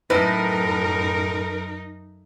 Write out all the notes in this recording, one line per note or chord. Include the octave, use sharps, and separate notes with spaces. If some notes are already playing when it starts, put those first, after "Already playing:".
F#2 A2 D#4 A#4 B4